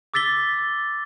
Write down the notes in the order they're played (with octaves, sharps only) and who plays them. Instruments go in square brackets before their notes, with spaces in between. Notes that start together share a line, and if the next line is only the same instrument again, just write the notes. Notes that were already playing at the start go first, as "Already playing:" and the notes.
[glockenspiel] D6 E6 A6 B6 G7